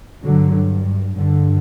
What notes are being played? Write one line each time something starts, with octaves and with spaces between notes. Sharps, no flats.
G2 D3 F#3
G2 D3